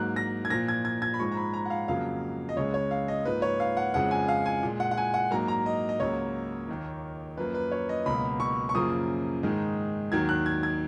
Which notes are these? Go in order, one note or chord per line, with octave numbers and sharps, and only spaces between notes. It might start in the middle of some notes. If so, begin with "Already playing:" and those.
Already playing: G#2 F#3 A#3 F#6
A#6
G#6
A#2 F3 A#3 A#6
G#6
G#6
G#6
B5
G#2 F3 G#3 C#6
A#5
B5
A#5
F#5
F5
F2 C#3 F#3 A#3 F5
D#5
C#2 C#3 G#3 C#5
C#5
F5
D#5
G#2 F3 A#3 B4
C#5
F5
F#5
F2 C#3 F3 G#3 F#5
G#5
F5
G#5
A#2 G#3
F#5
F#5
G#5
F#5
G#2 F#3 A#3 A#5
A#5
D#5
D#5
C#2 C#3 F#3 A#3 C#5
D#2 D#3 A#3
F#2 F3 A#3 B4
B4
C#5
D#5
C#2 B2 F#3 A#3 B5
C#6
C#6
F#2 C#3 F3 A#3 D#6
G#2 D#3 G#3
D#2 D#3 F#3 G#6
F#6
G#6
G#6